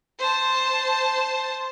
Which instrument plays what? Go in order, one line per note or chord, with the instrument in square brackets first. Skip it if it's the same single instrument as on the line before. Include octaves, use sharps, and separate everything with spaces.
[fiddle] C5 A5